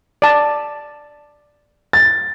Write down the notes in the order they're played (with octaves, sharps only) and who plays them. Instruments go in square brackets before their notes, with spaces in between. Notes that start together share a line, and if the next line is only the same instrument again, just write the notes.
[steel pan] D5 A5
[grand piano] A6